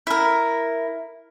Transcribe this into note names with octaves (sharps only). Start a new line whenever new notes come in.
E4 A#4